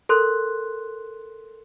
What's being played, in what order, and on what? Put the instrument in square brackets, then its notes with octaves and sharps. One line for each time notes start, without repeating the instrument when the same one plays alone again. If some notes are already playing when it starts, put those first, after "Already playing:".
[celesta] A4 A#4 C6 F#6